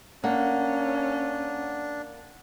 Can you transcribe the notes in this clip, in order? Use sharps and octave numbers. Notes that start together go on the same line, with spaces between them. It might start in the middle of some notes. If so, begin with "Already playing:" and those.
A#3 C#4 D4 F#5